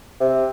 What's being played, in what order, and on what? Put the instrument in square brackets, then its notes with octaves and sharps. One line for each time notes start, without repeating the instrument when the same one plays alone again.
[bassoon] C3